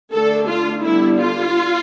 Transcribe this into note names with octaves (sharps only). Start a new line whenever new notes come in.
D3 A3 D4 A4
F4
D3 G3 B3 D4 E4
F4